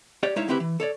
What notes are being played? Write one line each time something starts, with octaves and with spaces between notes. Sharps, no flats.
G4 C#5 D5
G#3 D#4 E4 C#5 E5 F5
D2 G3 C4 E4 G4 B4
E3
A4 C#5 D5